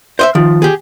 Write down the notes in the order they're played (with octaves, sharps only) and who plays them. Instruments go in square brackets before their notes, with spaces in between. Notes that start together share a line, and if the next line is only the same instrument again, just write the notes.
[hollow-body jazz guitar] C5 D#5 E5
[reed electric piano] D#3 F4 [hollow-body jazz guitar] F3
[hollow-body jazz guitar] G4 G#4